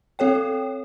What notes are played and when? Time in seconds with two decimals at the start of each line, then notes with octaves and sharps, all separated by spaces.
0.19 C4 A4 C#5 G5